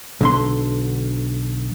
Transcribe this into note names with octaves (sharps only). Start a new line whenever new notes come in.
B1 D3 C6